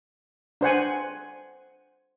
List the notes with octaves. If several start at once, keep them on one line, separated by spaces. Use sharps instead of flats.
D4 C5 F#5 G#5